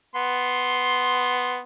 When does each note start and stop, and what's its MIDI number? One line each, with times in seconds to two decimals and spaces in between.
0.15 1.61 59
0.15 1.61 84